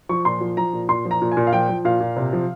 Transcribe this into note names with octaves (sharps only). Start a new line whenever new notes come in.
F3 C#6
A#2 C6
F3
F3 A#5
A#2
A#2 C6
F3
A#5
A#2
G#5
A#2
F5
F3 G5
F3
A#2 F5
A#2
C3
F3